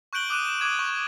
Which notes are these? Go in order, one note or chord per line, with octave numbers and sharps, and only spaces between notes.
C#6 F#6 G6 D7 F#7 G7
D6 D#6 F#6 D#7 E7
E7
D6 D#6 G#6 E7
C#6